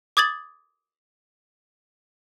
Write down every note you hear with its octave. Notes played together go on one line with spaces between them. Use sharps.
D6 D#6 G#6 A6 F#7